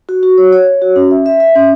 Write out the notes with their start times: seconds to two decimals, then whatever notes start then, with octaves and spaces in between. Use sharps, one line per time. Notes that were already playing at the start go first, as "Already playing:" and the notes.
0.09 F#4
0.23 F#4
0.38 C#5
0.53 C#5
0.67 C#5
0.82 F#4
0.96 C#4
1.11 E5
1.26 E5
1.40 E5
1.55 C#4